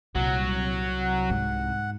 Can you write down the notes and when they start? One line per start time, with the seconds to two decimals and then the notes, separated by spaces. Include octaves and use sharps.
0.15 C2 A#2 F#3 F#5
1.30 G#2